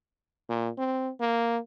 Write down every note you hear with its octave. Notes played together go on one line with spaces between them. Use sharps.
A#2
C4
A#3